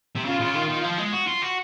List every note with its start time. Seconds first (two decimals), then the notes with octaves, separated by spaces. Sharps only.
0.15 C3
0.25 C#3 F4
0.40 C#3
0.55 D#3
0.69 D#3
0.84 F3
0.98 G#3
1.13 F#4
1.28 F4
1.42 F#4